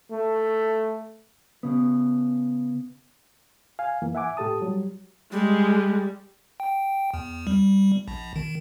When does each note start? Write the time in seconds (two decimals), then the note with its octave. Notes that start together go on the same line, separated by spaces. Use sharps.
0.11 A3
1.63 C#3 B3
3.79 F5 G#5
4.02 F#2 E3 A#3
4.15 E5 F#5 G#5 D6
4.37 A2 G4 A4 A5 D#6
4.62 F#3 G3
5.32 G3 G#3
6.60 G5
7.14 E2
7.47 G3
8.08 A#1
8.36 D#3